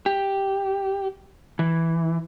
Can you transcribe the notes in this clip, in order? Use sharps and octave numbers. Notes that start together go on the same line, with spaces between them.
G4
E3